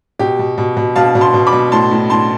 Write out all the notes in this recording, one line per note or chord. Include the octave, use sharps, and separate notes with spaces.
B2 G4
B2
B2
B2
B2 F5 A5
B2
A5 C6
B2
B5 D6
B2
A2 A5 C6
A2
A2 A5 C6